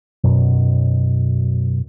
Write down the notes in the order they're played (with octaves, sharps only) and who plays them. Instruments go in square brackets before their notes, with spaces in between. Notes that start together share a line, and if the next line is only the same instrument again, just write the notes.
[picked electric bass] F#2 B2 F#3